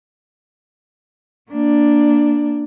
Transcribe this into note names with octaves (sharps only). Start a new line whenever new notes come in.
A#3 D4